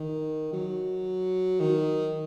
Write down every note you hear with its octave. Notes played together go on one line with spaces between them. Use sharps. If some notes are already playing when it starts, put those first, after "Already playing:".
Already playing: D#3
F#3
D#3